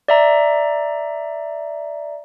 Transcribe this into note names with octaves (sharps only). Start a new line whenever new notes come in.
D5 E5 A#5